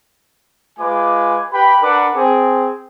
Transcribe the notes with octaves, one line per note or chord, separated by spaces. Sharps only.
G#3 F4 B4 G#5 D6
G4 B4 G5 B5
D4 A#4 B4 F#5 D6
C4 G#4